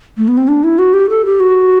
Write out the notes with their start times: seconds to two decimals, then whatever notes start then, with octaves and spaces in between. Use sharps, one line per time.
0.17 A3
0.28 B3
0.37 C4
0.48 D4
0.64 E4
0.79 F#4
0.93 G4
1.10 A4
1.25 G4
1.40 F#4